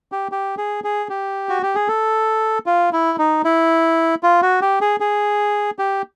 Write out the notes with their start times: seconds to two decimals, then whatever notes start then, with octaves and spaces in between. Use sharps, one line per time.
0.12 G4
0.32 G4
0.58 G#4
0.84 G#4
1.10 G4
1.49 F#4
1.63 G4
1.75 G#4
1.88 A4
2.66 F4
2.93 E4
3.18 D#4
3.45 E4
4.23 F4
4.42 F#4
4.62 G4
4.81 G#4
5.00 G#4
5.79 G4